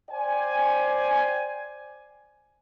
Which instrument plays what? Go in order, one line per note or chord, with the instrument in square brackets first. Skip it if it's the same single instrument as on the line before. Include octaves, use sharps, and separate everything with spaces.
[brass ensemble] C5 D5 G5 G#5